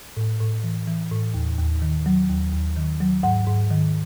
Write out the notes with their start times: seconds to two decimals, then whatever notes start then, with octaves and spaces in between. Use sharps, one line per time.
0.17 A2
0.40 A2
0.64 E3
0.87 E3
1.12 A2
1.34 D#2
1.58 D#2
1.82 D#3
2.06 F#3
2.29 D#2
2.53 D#2
2.76 D#3
3.00 F#3
3.23 G#2 F#5
3.47 G#2
3.71 D#3